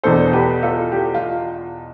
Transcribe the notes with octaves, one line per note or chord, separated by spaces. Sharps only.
E2 B2 B3 D4 A4 C5
G4 B4
F4 A4
G4
F4